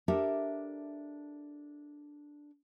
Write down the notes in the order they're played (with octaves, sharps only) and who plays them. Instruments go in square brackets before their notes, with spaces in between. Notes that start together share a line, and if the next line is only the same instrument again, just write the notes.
[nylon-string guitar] D4 G4 A4 A#4 E5